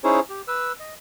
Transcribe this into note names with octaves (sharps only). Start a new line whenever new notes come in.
C#4 D#4 E4 G#4 C5 C#5
G4
B4 E6
D#5